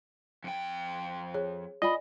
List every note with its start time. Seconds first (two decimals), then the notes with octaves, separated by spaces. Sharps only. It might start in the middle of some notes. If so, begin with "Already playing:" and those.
0.44 F2 G5
1.34 G#4 C#5
1.82 F4 D5 D#5 G#5 B5